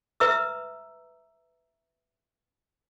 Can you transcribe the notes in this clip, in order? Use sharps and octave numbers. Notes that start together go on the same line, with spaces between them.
B4 E5 A#5 D#6 E6